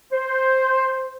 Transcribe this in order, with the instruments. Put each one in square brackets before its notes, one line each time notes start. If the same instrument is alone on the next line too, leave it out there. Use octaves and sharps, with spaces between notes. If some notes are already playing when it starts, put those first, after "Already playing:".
[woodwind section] C5